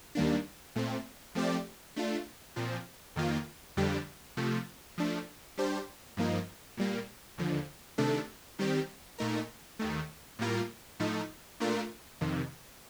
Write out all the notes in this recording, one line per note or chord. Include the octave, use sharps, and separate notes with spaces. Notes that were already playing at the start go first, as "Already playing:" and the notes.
D#2 D#3 G3 A#3 D4
A#2 A3 C4
F3 A3 C4 G4 D5
A3 D4 F4
A#2 F3 C4
F2 D#3 A#3 F4
F2 D3 G3 D4 G4
C3 F3 A3
F3 A3 D4
G3 D4 G4 C5
G2 F3 A#3 D#4
A#2 G3 A#3
D#2 D3 F3
C3 D#3 A3 D4 A4
D#3 G3 C4 G4
A#2 A3 D#4 A#4
D#2 D#3 A3
A2 G3 A#3 F4 A#4
A2 F3 A3 D#4
A#2 A3 D4 F4 A#4
F2 C3 D#3